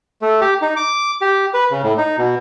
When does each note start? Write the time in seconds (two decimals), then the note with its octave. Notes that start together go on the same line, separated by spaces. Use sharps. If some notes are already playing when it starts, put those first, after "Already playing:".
0.22 A3
0.41 G4
0.62 D#4
0.76 D6
1.21 G4
1.54 B4
1.71 C#3
1.84 A2
1.98 D#4
2.18 B2